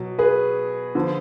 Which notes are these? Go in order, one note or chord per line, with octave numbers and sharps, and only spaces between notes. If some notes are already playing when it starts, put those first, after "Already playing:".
Already playing: B2 F#3
G#4 B4
D3 F3